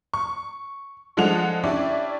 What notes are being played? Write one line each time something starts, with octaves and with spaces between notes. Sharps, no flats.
C#6
F3 G#3 D4 A4 F#5 F7
C#4 D4 E4 G4 D5 E5